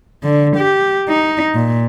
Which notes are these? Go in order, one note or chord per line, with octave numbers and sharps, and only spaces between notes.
D3
G4
D#4
A#2